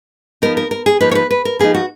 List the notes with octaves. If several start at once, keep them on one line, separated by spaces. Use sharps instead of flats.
F3 B3 D#4 A#4
A#4
A#4
G#4
F3 A#3 D#4 B4
C#5
B4
B4
A#4
F3 A#3 D#4 G#4
F#4